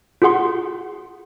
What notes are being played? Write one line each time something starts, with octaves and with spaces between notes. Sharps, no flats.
F4 F#4 G#4 F#5 C6